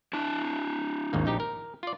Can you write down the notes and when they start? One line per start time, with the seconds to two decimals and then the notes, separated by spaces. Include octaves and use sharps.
0.13 D4 E4 A5
1.13 G#1 D#2 A#3
1.26 A#1 D#4 G4
1.40 A#4
1.83 F4 D5